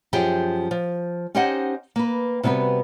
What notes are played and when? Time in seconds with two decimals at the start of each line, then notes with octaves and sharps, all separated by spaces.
0.13 F#2 F3 G4 G#4 G5
0.71 F3
1.35 C#4 D#4 G4 C5 D#5 F#5
1.96 A#3 B4
2.43 C3 G3 B3 F#4 B4